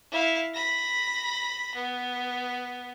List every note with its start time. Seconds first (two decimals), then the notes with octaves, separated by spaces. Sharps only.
0.12 E4 F5
0.54 B5 A#6
1.75 B3